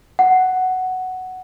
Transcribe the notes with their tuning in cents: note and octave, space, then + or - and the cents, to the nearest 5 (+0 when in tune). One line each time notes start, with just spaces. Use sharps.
F#5 +5